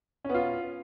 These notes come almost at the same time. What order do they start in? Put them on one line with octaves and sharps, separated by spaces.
C#4 B3 F4